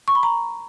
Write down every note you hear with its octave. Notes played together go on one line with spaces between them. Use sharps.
C#6
B5
A#5